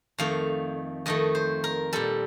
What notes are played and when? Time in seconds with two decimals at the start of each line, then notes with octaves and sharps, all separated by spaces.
0.18 F2 D#3 A3 F5
1.06 F2 D#3 A3 D#5
1.35 C5
1.64 A#4
1.93 A#2 G3 A4